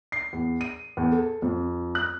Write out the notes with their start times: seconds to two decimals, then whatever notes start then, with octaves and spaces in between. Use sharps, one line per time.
0.12 C7
0.33 E2
0.61 D#7
0.97 E2
1.12 A4
1.42 F2
1.95 F#6